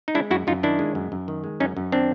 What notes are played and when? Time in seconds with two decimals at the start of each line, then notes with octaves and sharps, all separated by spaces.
0.08 D#4
0.15 G#3 D4 E4
0.30 F#2 E4 F#4
0.47 F#2 D#4 F4
0.63 D#3 D4 E4
0.79 G#3
0.95 F#2
1.12 F#2
1.28 D#3
1.44 G#3
1.60 F#2 C#4 D#4
1.77 F#2
1.92 D#3 C4 D4